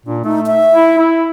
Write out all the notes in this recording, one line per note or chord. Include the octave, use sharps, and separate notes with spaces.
A#2 D4
A3 D#4
E5
E4
E4